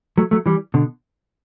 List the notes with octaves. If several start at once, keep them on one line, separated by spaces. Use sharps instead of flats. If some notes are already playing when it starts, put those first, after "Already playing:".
F#3 A3
F#3 A3
E3 G3
B2 D3